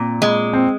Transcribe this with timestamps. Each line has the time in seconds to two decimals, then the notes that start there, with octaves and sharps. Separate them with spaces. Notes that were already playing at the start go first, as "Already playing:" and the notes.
Already playing: A#2 C4
0.22 G#3
0.53 C4